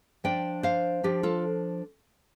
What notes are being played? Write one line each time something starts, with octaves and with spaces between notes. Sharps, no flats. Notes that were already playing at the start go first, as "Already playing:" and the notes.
F3 D4 D5 G5
C5 F5
F3 D4 G4
F4 A4